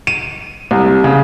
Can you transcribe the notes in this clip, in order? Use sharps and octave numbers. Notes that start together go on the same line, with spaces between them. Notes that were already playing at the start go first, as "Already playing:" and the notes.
D#7
C2
C#3